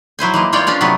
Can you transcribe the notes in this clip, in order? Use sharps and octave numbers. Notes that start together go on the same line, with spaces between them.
F#3 E4 C5 G#5
E3 G#3 A#3
G#3 F4 C#5 D5 G5
C#4 D4 F4 D5
C3 F#3 A3 B3